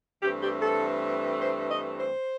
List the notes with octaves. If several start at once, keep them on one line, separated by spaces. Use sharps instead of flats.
G2 E3 A3 C4 G4
G4
A4
C5
D#5
C5